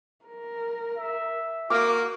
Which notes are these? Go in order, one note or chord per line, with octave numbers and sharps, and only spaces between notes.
A#4
E5
A#3 F#4 D6